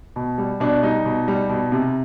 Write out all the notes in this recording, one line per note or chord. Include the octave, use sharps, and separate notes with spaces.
B2
G3
B2 D4
G3 D#4
B2
G3
B2
C3